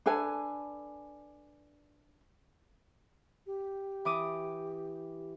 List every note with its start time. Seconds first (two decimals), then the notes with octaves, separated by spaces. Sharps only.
0.06 D4 A4 B4 G#5
3.46 G4
4.05 E3 D6 D#6